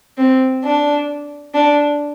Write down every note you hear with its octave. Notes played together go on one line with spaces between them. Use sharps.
C4
D4
D4